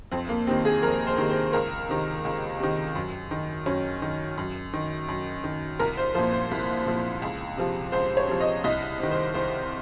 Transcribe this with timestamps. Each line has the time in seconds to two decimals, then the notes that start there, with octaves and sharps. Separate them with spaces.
0.11 F2 C4
0.29 A#3
0.47 C3 D#3 C4
0.65 G#4
0.83 F2 A#4
1.07 C5
1.18 C3 D#3
1.30 C5
1.53 C#2 A#4
1.89 C3 D#3
2.25 C#2
2.60 C3 D#3
2.95 F#2
3.31 D#3
3.66 F#2 C#4
4.02 D#3
4.38 F#2
4.73 D#3
5.09 F#2
5.44 D#3
5.79 C2 A#4
5.97 C5
6.15 A#2 F3 C5
6.33 C5
6.51 C2
6.86 A#2 F3
7.22 C#2
7.57 C3 F3
7.92 C#2 C5
8.17 C#5
8.28 C3 F3
8.41 D#5
8.64 C2 D#5
8.99 C3 D#3
9.11 C5
9.34 C2 C5